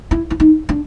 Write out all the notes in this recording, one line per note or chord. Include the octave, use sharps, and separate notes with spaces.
E4
E4
D#4
D4